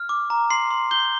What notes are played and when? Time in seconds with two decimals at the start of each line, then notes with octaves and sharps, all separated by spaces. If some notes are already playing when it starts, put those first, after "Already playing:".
Already playing: F6
0.09 D6
0.30 A#5
0.50 C6 C7
0.71 C6
0.91 G6 G7